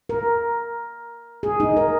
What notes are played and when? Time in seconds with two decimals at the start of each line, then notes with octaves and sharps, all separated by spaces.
0.09 A#4
1.43 G#4
1.60 D#4
1.77 A#4